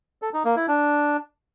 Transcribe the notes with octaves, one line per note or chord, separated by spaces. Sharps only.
A4
D#4
A#3
E4
D4